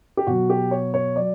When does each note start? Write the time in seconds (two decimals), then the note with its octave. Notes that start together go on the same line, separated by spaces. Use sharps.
0.17 G4
0.27 B2 F#3 F#4
0.50 G4
0.71 C#5
0.94 C#5
1.16 F#3 D5